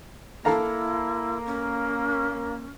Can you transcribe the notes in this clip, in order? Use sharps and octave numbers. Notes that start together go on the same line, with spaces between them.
A#3 E4 A4 F5 A#5
C#4